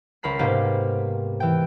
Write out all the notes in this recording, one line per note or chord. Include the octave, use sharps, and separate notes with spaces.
C#2 A#4 B5 C7
G#2 C3 A#3 B3 G4
E3 G5